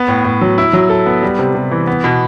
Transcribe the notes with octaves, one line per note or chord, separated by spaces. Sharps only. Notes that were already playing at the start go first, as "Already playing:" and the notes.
Already playing: B3
A2
A2
F#3
E4
F#3
A4
B3
G3
C3
C3
E3
B3
B2